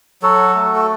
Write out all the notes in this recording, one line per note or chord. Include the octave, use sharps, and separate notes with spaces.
F#3 F#4 A4
A3
A4